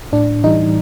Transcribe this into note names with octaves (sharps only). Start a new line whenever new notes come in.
A2 D4
E3 G3 D#4